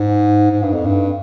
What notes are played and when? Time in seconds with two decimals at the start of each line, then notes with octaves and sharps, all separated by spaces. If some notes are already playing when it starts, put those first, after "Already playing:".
Already playing: G#2
0.51 G#2
0.63 G2
0.74 F2
0.86 G2